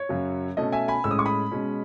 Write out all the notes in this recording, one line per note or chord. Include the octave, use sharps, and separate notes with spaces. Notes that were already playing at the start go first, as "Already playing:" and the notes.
Already playing: C#5
F#2 C#3 F#3
B2 A3 C#4 D#5
E5 G#5
G#5 B5
A2 G#3 C#4 E6
D#6
C#6
B5 D#6
B2 G#3 C#4